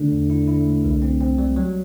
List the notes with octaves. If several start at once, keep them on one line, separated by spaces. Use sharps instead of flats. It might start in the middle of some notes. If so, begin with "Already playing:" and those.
Already playing: D3 A3
E2
E4
E4
A3
C2
C4
C4
G3
F#3